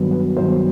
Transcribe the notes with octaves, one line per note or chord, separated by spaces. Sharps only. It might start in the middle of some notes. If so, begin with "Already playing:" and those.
Already playing: G2 D#3 F#3 B3
B4
G2 D#3 F#3 B3 C5